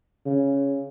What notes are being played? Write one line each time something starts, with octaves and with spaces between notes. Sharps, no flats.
C#3